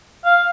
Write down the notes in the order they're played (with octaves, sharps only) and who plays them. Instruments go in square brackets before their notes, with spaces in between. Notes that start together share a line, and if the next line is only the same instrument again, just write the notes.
[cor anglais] F5